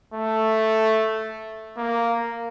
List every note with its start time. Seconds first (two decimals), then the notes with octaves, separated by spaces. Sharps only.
0.14 A3
1.77 A#3